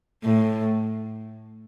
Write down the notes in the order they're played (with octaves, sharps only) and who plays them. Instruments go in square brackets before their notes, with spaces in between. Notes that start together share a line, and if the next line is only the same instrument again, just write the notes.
[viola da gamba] A2